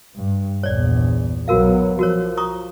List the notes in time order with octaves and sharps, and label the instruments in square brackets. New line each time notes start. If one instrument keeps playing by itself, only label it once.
[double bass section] G2
[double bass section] A#1 E2 [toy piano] C#5 D5
[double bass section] B1 F#3 B3 [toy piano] F#4 A#4 F5
[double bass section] F3 [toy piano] F#4 A#4 C#5
[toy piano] A#5 C#6 D#6